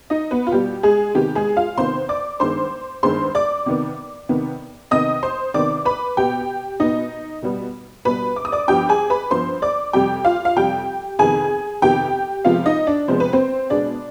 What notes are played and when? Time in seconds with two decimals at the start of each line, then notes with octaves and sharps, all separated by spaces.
0.10 D#4 D#5
0.31 B3 B4
0.47 F4
0.52 B2 G3 B3 G4
0.83 G#3 G#4
1.15 C3 D#3 B3 G4
1.35 G#3 G#4
1.57 F4 F5
1.77 C3 D#3 B3 C5 C6
2.09 D5 D6
2.40 G2 D#3 G#3 B3 C5 C6
3.03 G2 D#3 G#3 B3 C5 C6
3.35 D5 D6
3.66 C3 D#3 B3
4.29 C3 D#3 B3
4.91 C3 D#3 B3 D#5 D#6
5.23 C5 C6
5.54 C3 D#3 B3 D5 D6
5.85 B4 B5
6.17 B2 B3 G4 G5
6.80 B2 B3 D#4 D#5
7.42 B2 G3 B3
8.05 B2 G3 B3 B4 B5
8.36 D6
8.45 D#6
8.52 D5 D6
8.68 G2 F3 B3 G4 G5
8.89 G#4 G#5
9.10 B4 B5
9.31 G2 F3 B3 C5 C6
9.62 D5 D6
9.93 F2 C3 G3 G4 G5
10.25 F4 F5
10.45 F5
10.56 F2 C3 G3 G4 G5
11.19 F2 C3 D#3 B3 G#4 G#5
11.82 F2 C3 D#3 B3 G4 G5
12.45 C3 F3 G#3 B3 F4 F5
12.66 D#4 D#5
12.87 D4 D5
13.08 C3 F3 G#3 B3 C5
13.20 B4
13.33 C4 C5
13.70 B2 G#3 B3 D4 D5